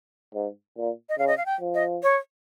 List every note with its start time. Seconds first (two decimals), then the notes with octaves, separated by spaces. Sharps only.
0.35 G#2
0.77 A#2
1.09 D#5
1.19 C#3 F5
1.28 D#5
1.38 F5
1.46 G5
1.60 F3
1.74 D#5
2.03 C#5